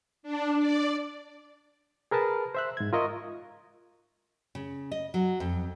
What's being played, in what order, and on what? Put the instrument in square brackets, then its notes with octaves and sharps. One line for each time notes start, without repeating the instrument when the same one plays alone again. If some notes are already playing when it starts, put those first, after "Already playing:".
[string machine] D4
D5
[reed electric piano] G#4 A#4 B4 A5
C5 E5 F#6
G#2 G#6
F4 A#4 D#5 E5 C#6
[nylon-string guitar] C#3
D#5
F#3
F2